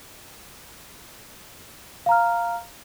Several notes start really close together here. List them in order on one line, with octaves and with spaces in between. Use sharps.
F5 A#5 F6